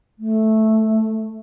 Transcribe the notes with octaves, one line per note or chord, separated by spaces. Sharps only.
A3